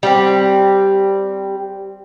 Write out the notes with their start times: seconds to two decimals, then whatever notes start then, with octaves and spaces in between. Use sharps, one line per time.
0.03 G3 C4